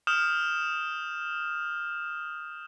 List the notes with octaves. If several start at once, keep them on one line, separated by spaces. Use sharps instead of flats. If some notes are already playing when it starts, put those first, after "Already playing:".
D#6 F6 G6 E7